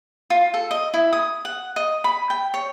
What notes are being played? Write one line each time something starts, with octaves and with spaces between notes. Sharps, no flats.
F4
A4
D#5
E4
D#6
F#5
D#5
B5
G5
C#5